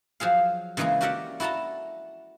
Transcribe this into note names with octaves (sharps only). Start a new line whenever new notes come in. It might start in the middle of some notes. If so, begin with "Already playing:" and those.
F3 F#3 G#4 F5
C#3 E3 G#3 A#3 G#4
F#4 G4 A#4 D5 E5 F#5
E4 F#4 A4 A5 A#5